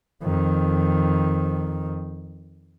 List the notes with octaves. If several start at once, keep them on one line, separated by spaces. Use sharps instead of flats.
F2 D#3